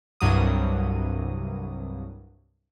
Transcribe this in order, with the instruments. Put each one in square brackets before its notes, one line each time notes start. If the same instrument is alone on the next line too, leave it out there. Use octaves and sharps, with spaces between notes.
[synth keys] C2 G2 F#3 D#6